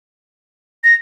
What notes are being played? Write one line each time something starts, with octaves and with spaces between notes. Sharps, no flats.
A#6